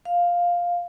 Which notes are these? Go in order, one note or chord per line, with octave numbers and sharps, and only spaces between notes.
F5